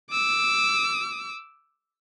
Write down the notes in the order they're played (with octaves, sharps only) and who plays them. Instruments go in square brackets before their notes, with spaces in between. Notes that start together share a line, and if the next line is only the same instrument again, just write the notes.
[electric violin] D6 E6